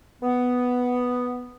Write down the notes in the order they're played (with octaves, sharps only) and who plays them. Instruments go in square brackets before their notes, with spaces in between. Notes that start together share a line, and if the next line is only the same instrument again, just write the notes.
[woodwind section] B3